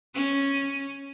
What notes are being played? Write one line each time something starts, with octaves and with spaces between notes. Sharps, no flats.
C#4